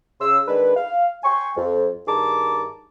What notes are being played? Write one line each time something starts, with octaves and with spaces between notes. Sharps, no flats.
C#3 C6 E6
D#3 G#3 D4 B4
F5
G5 G#5 C6 C#6
F2
G2 D#3 G#4 A5 A#5 D6